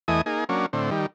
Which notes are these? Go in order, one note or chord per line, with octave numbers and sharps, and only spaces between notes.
E2 E3 A3 D#5 G#5 D#6
A#3 D#4 G#4
F#3 A#3 C#4 D4
A2 D3 C4
D#3 G3